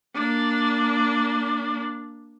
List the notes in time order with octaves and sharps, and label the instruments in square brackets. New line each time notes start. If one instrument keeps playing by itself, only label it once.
[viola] A#3 D4